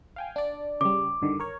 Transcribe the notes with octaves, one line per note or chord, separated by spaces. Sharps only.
F5 G5 G#5
D4 D5
C#3 G3 D6
G2 D3 D#3
A#4 C#5